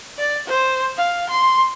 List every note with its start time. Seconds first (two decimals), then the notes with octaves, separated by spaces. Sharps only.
0.18 D5
0.47 C5
0.97 F5
1.29 C6